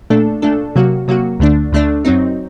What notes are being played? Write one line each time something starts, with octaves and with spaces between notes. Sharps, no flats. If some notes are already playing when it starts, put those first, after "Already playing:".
A#2 A3 D4 A4
A#2 A3 D4 A4
C3 F#3 A#3 F#4
C3 F#3 A#3 F#4
D2 D3 A3 D4
D2 D3 A3 D4
F#2 F#3 C4 D#4